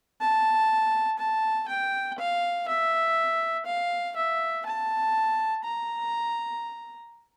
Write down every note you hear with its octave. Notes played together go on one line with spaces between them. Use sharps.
A5
A5
G5
F5
E5
F5
E5
A5
A#5